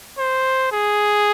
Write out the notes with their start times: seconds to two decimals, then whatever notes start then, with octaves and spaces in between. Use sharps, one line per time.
0.18 C5
0.72 G#4